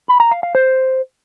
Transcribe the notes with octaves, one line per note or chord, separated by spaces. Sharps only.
B5
A#5
F5
F5
C5